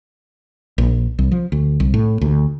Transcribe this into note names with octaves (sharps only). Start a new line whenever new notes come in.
A#1
C2
F3
D2
C2
A2
D2